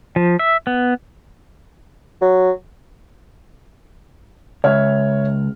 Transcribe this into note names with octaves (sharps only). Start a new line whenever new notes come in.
F3
E5
B3
F#3
C#2 C#5 E5 F6